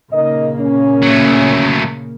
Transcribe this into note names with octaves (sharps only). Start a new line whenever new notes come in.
A#2 C#3 A#3 D#4 A#4 D#5
C#4
F#3 A3